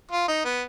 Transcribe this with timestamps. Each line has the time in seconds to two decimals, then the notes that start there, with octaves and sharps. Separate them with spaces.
0.11 F4
0.28 D#4
0.45 B3